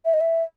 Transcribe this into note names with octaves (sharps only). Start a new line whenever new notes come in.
E5
D#5
E5